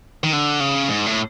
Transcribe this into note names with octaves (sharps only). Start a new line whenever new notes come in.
D#3
D3
C#3
G#2
A2